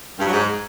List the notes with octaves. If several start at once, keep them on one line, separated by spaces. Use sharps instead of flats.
G2
F#3
G#2